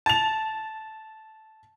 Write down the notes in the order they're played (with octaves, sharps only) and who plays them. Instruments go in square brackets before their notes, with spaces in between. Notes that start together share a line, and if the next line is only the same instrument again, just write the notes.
[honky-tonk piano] A5 F7